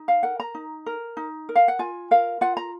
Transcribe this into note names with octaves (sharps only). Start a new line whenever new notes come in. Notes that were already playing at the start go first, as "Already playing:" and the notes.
Already playing: D#4
F5
A#4 F#5
A#5
D#4
A#4
D#4
A#4
F5
F#5
F4 G#5
A#4 F5
F4 F#5
A#5